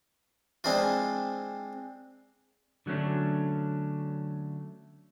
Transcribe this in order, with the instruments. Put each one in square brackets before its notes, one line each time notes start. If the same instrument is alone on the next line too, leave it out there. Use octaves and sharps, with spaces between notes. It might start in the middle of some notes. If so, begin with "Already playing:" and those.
[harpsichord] G#3 C4 D4 E4 F4
[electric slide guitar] D3 F#3 A3 C#4 D4